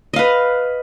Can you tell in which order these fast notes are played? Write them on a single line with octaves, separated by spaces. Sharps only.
D#5 F5 B4